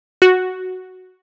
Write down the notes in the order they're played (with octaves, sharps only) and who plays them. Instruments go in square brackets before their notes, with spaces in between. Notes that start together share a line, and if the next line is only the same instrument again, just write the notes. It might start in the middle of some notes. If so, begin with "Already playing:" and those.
[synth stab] F#4